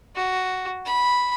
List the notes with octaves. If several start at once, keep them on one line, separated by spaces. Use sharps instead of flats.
F#4
B5